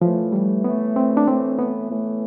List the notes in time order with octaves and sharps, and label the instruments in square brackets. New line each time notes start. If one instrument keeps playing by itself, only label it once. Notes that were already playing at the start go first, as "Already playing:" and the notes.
[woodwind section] A2 E3 A3 [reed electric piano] F3
[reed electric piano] G3
[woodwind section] A2 E3 A3 [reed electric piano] B3
[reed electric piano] C4
D4
[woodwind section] A2 E3 A3 [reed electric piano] C4
[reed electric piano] B3
[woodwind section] A2 E3 A3